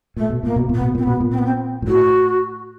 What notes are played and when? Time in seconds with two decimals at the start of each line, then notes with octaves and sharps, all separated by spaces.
0.16 A#2 A3
0.30 B2
0.43 A#2 A#3
0.56 B2
0.69 A#2 B3
0.82 B2
0.95 A#2 C4
1.03 B3
1.07 B2
1.20 A#2
1.31 C4
1.38 B3
1.46 C4
1.82 A#2
1.87 A2 F#4